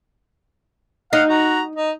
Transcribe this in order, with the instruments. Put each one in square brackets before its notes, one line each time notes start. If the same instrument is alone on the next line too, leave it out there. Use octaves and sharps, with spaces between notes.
[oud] D#4 [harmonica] F5 F#5
[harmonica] F#4 A#5
D#4